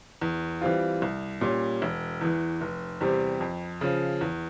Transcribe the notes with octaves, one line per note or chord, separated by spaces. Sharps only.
E2
E3 G3 C4 F4
C2
A#2 G3 C#4
E1
E2 E3
F1
E2 C3 G3 C4
F2
C#3 F3
E2